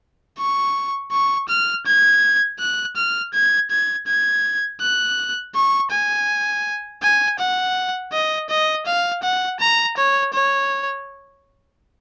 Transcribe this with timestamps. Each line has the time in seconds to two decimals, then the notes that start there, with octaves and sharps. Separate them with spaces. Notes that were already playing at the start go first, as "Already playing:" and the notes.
0.39 C#6
1.12 C#6
1.49 F6
1.86 G#6
2.60 F#6
2.96 F6
3.34 G#6
3.71 G#6
4.07 G#6
4.81 F#6
5.55 C#6
5.92 G#5
7.03 G#5
7.39 F#5
8.13 D#5
8.50 D#5
8.87 F5
9.23 F#5
9.60 A#5
9.98 C#5
10.34 C#5